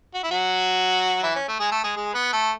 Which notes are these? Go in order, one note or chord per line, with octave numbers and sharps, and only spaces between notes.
F#4
E4
F#3 F#4
E3 E4
C#4
A3
G#3 G#4
A3 A4
G#3 G#4
G#3 G#4
B3 B4
A3 A4